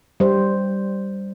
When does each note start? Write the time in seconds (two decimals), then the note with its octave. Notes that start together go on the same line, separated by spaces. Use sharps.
0.20 G3 C5